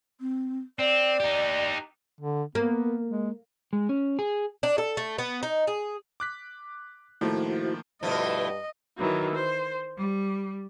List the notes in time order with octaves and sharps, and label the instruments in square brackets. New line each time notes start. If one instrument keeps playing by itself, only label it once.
[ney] C4
[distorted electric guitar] C4 [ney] D5
[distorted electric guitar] D#4 G4
[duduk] D3
[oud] A#3 [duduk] B3
[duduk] G#3
[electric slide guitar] G#3
C#4
G#4
[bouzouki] D4
A4
A3
B3
D#4
G#4
[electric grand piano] D6 F#6 B6
[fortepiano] A2 [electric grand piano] D#3 F3 A#3 [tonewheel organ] E4 F#4 C5
[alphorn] G2 [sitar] B2 F3 [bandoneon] A3 E4 [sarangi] D#5
[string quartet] D#3 E3 F#3
C5
G3